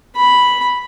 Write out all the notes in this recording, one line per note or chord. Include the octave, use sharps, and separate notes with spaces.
B5